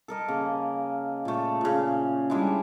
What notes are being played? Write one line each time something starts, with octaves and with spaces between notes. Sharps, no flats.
A4 A#4 D#5
C#3 A#3
A#2 A3
A#2 C#3
G3 G#3 D4 E4